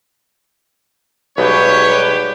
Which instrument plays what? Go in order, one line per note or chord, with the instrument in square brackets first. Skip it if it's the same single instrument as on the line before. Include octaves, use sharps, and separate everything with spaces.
[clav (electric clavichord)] B1 B2 [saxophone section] G#2 G3 B4 [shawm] G4 [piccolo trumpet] C#5